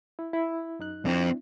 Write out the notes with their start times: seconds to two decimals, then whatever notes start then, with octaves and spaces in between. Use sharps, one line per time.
0.19 E4
0.33 E4
0.79 F#2 D#4 F#6
1.05 F2 C4 D4 E4